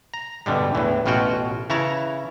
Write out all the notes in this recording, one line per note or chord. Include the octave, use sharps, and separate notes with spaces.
A#5
G2 B2 D3 G3 G#3
E2 A2 E3
A1 B2 C#4 F4 F#4 G5
C#3 E3 E4 C#5 A5 A#5